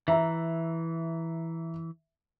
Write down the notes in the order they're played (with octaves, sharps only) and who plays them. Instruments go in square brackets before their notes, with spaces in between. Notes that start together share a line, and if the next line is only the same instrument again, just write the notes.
[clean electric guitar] E3 [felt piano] E5 A#5